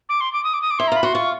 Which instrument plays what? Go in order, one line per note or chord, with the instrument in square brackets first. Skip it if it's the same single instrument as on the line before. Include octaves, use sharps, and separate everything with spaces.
[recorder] D6
C6
D6
D#6
D6
D#6
D6
[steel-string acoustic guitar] E4 [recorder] C6
[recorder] A#5
[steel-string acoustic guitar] F4 [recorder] B5
[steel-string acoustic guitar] F#4 [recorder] C6
[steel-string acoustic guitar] F4 [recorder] C#6